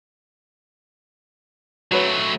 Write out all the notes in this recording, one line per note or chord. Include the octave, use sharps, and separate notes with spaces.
F#3 A3 F#4 B4 C#5